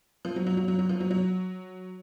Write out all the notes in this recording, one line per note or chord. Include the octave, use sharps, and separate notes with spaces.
F3
F#3
F#3
F#3
F#3
F#3
F3
F#3
F#3